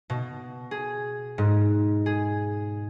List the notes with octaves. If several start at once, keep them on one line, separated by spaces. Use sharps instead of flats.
B2
G#4
G#2
G#4